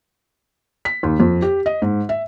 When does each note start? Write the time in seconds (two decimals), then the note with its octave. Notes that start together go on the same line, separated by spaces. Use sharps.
0.85 B6
1.03 D#2
1.20 F2
1.42 G4
1.66 D#5
1.82 G#2
2.09 E5